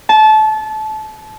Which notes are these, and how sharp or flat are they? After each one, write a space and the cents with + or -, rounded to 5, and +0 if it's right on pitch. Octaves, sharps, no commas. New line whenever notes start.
A5 -25